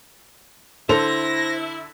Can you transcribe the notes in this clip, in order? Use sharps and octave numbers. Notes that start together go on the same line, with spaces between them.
D3 E4 A4 C5 A#6 F7